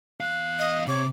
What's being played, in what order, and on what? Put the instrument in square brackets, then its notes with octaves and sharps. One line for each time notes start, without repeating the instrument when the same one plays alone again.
[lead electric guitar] E2 F5 [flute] F#6
[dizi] D#5
[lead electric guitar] C3 [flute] C#5 [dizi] D6